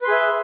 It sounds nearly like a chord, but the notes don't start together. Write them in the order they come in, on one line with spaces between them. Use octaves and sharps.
B4 C6 G#4 E5